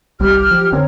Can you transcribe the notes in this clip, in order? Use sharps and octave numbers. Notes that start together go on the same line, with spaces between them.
G1 C2 G3 G4 F6
F3
F1 D3 C4 A#4 C#5